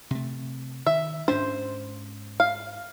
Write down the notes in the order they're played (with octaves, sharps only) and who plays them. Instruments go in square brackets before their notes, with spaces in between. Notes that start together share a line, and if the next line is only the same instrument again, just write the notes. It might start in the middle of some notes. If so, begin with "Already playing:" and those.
[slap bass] C3 A3
[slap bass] D#3 [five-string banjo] E5
[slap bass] G#2 C#4 D4 [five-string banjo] C5
[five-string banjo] F5